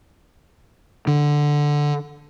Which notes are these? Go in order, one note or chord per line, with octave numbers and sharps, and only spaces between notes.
D3